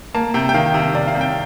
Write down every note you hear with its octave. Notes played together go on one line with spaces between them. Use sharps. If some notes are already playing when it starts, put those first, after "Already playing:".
A#3 A5
C3 G5
G5
D#3 F5
C3
C3 D5
F5
C3
G5